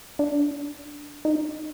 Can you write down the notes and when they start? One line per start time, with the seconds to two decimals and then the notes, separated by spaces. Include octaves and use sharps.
0.19 D4
1.25 D#4